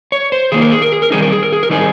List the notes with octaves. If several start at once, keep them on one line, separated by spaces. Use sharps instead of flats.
C#5
C5
D#3 A#3 D#4 G#4
A#4
G#4
A#4
G#4
A#4
D#3 G3 C4 D#4 G#4
A#4
G#4
A#4
G#4
A#4
D#3 G3 C4 D#4 G#4